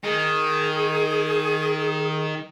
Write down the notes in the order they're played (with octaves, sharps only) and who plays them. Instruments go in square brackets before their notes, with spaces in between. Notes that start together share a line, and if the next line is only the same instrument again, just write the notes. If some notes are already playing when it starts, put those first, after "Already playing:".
[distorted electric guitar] D#3 [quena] G#4